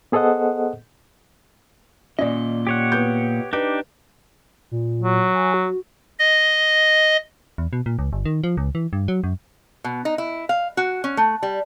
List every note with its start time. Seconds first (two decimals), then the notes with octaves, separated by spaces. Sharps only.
0.12 B3 G#4 A4 C5 D#5 F#5
2.19 A#2 C#4 D5 D#5
2.67 G4 C#5 F#5
2.92 B3 G6
3.53 D4 D#4 G4 B4
4.71 A#2
5.01 F#3
5.34 G#5
5.54 F#4
6.19 D#5
7.58 E2
7.73 B2
7.86 A#2
7.99 C#2
8.13 G1
8.25 D#3
8.44 F3
8.57 C#2
8.75 E3
8.93 G2
9.08 F#3
9.24 F#2
9.84 B2
10.05 D#4
10.18 E4
10.49 F5
10.77 F#4
11.04 C#4
11.17 A3
11.43 G3